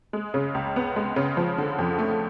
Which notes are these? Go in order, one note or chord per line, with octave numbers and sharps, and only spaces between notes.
G#3
C#3
C#2
B3
G#3
C#3
F3
D3
F2
A3